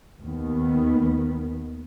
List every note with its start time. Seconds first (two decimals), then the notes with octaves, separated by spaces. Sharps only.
0.22 D#2 D#3 B3